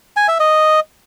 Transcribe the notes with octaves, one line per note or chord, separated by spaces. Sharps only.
G#5
E5
D#5